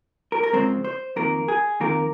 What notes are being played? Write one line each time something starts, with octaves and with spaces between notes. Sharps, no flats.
A#4
A#4
F2 C#3 G#3 C4 C5
C5
F2 D#3 A#3 A#4
G#4
F2 D#3 A#3 A#4